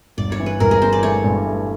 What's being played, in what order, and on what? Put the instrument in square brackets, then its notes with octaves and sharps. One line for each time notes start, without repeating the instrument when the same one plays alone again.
[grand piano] G1 [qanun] D5
[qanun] C#5
[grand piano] E3
[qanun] B4
[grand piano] G1 [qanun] A#4
[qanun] G#4
[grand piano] E3 [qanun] C5
[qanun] D5
[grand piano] A3 [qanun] C#5
[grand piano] G2
A3